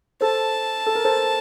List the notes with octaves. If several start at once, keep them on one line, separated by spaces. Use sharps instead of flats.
A4 C5 A5
A4
A#4
A4 C5